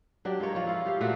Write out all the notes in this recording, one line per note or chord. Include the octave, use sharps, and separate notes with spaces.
F#3 D4 G4 G5
G#3 F4 A#4 C#5
F3 C#5
E4 F4
F4 G4 F5
A#2 A3 F#4 F5